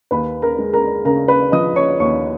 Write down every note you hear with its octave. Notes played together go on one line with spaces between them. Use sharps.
D#2 B4 B5
A#4 A#5
G#3
A#4 A#5
C#3 A#4 A#5
B4 B5
F3 D#5 D#6
C#5 C#6
D#2 C#5 C#6